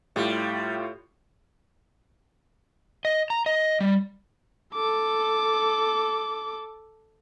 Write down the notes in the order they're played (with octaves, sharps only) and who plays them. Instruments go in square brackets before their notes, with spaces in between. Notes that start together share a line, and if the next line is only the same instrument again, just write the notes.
[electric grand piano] A2 F4 G4 [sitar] G3
[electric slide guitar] D#5
A#5
D#5
G3
[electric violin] A4 D6